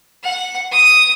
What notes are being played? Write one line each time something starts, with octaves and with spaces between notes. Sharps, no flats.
F#5
D#6